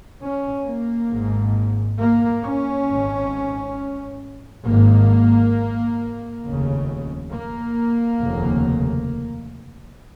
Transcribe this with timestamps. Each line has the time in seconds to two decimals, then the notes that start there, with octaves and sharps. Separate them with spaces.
0.22 C#4
0.66 A#3
1.11 G#1 G#2
1.99 A#3
2.44 C#4
2.87 G#1 G#2
4.65 G#1 A#3
4.70 G#2
6.43 F1 D#2 C#3
7.32 A#3
8.21 F1 D#2 C#3